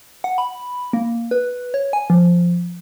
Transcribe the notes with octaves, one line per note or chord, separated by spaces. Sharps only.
F#5
B5
A#3
B4
C#5
G#5
F3